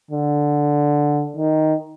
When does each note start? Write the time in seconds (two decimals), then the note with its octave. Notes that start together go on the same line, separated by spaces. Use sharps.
0.11 D3
1.37 D#3